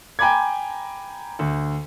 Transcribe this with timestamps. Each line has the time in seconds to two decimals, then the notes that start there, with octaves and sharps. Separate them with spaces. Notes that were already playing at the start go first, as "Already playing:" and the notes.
0.19 G5 G#5 A#5 B5 D6 G#6
1.39 D2